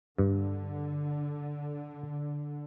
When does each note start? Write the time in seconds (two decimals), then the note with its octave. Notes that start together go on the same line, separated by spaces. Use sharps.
0.18 G2 D3